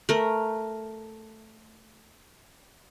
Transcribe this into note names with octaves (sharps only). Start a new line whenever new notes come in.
A3 A#4